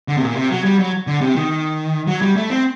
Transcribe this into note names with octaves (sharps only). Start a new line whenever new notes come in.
D3
C3
A#2
C3
F#3
G3
F#3
D3
C3
D#3
F#3
G3
A3
C4